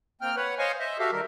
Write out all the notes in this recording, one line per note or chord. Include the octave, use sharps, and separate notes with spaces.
A#3 C4 G5 F6
B4 C#5 F#5
C5 C#5 D#5 F5 G#5 C#6
C5 D#5 E5
F#4 G4 A4 E5 F5
D#3 G3 A#4